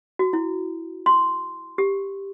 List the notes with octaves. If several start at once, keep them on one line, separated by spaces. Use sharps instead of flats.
F#4
E4
C6
G4